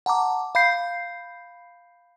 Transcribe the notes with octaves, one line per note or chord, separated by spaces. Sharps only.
F#5 A5 A#5 D6
F5 B5 G6 C7